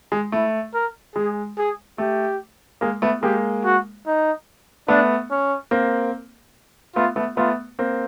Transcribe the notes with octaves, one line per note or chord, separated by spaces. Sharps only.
G#3
A3 E4
A#4
G#3 G#4
G#4
A3 G4
G#3 A#3
A3 B3
G#3 A#3 G4
F#4
D#4
A3 B3 D4
C#4
A#3 C4
A3 B3 F4
A3 B3
A3 B3 F4
A#3 C4